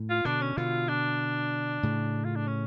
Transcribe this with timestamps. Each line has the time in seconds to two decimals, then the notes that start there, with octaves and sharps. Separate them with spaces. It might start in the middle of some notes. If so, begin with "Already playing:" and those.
Already playing: A2
0.10 F4
0.25 B2 D3 D4
0.41 C#4
0.57 B2 D3 F4
0.89 D4
1.83 A2 C#3
2.24 F4
2.35 D4
2.47 C#4